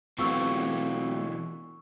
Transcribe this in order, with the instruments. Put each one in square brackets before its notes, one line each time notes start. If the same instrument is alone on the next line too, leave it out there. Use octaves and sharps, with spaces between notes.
[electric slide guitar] B2 E3 F4 [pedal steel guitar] F#3 A3 C4 [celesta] C#6 E6